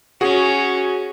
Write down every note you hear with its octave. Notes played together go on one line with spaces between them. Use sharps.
C#4 F#4 G#4